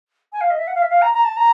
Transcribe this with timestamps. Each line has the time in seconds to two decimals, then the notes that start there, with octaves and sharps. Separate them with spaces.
0.33 G#5
0.41 F5
0.50 D#5
0.58 E5
0.67 F#5
0.75 F5
0.82 E5
0.89 F5
1.02 A#5
1.14 A#5
1.25 A5
1.37 A#5